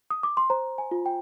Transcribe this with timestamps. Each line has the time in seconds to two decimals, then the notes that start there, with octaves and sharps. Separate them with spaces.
0.10 D#6
0.23 D6
0.37 C6
0.50 C5 A#5
0.78 G#5
0.91 F4
1.06 G5